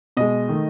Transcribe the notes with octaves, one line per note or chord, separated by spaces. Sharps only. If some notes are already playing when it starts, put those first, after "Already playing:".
B2 G#3 D#5
D#3 A3